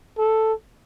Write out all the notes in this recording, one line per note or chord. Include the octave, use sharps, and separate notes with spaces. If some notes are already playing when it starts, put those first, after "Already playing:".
A4